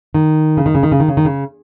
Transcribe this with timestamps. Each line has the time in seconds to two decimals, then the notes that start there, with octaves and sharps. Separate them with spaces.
0.14 D#3
0.57 C#3
0.66 D#3
0.75 C#3
0.83 D#3
0.92 C#3
1.00 D#3
1.08 C#3
1.17 D#3
1.25 C#3